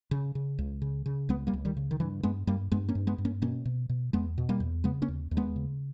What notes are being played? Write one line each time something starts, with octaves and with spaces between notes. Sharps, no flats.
C#3
C#3
C#2
C#3
C#3
C#2 G#3 B3
G3 A#3
C#2
D#3 G3
C#3
D#3
G2 E3
G2 G#3 B3
G2 G3 A#3
G2 G#3 B3
A#3 C#4
G2
G#3 B3
G2
A#3 C#4
B2 A#3 C#4
B2
B2
E2 G#3 B3
B2
G3 A#3
E2
C#3 G#3 B3
A#3 C#4
D#2
D#2
G#3 B3
C#3